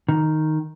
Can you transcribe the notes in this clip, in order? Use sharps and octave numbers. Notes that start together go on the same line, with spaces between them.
D#3